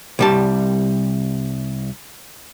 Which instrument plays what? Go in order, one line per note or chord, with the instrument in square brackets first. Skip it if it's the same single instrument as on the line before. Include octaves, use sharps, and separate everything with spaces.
[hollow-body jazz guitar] C2 G3 A5